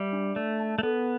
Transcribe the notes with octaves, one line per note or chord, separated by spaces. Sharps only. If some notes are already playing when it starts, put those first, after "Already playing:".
Already playing: G3 D5 E5
D4
A3 D5
A5
A3
B3 A4